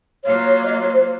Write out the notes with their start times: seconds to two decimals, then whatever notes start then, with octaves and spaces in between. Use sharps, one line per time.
0.24 F#3 A#3 F4 C#5
0.45 C#5
0.61 C#5
0.65 D#5
0.80 C#5
0.93 C5